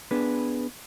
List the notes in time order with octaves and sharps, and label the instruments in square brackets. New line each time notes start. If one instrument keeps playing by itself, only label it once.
[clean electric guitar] B3 D4 G#4 B4